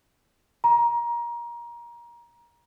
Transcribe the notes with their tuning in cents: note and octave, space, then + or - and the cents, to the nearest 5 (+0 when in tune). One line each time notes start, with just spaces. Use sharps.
A#5 +25